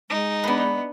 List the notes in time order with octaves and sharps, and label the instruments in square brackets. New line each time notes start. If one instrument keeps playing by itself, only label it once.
[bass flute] G#3 [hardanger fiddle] D#4
[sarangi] B3 [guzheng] D4 B4